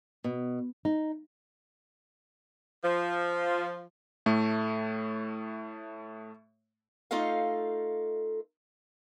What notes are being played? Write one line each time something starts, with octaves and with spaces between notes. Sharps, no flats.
B2
D#4
F3
A2 A3
A3 D#4 F4 A4 D#5 F5